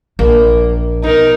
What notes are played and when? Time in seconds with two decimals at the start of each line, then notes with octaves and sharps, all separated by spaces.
0.19 A#1 A#3
1.04 B2 D#4 A#4